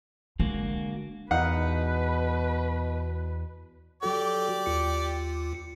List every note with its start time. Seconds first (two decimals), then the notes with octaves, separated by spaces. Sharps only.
0.40 D3 G#3 A#3 F#4
1.31 E2 B2 D#4 B4 F5 F#5
4.03 F#3 F#4 G4 A4 D5
4.66 D#2 F4 C#7